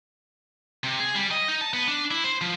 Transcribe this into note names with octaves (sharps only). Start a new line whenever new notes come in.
C3
G#4
G3
D#5
D#4
A5
B3
D4
E4
C5
F3